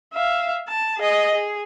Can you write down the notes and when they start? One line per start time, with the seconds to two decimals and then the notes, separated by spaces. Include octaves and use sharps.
0.14 E5 F5
0.68 A5
0.98 G#4 D#5
1.34 G#4